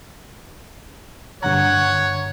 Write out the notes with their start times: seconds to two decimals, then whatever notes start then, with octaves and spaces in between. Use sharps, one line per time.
1.43 G2 D3 C#5 F#5 A#5